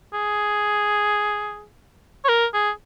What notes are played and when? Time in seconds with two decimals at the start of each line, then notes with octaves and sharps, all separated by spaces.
0.13 G#4
2.24 C#5
2.29 A#4
2.53 G#4